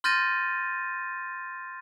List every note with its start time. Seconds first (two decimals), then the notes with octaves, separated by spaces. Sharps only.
0.04 C6 F6 G6 A6 A#6 D#7